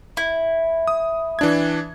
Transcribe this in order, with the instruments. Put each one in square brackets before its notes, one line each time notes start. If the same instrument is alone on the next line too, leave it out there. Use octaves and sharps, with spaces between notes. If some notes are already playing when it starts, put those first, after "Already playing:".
[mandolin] E4
[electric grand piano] D#6
E3 D4 G#6